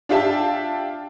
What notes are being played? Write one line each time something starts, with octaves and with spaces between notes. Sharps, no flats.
D4 F4 G4 E5 A5